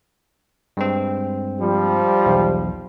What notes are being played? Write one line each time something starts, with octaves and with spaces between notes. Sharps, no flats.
G2 G#3 C4
F3 G3
B1 E2